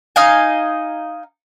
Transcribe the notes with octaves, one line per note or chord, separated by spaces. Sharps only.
D#4 D#5 F5 G#5